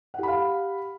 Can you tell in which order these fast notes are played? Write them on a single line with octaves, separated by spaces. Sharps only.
F#5 G4 B5 F5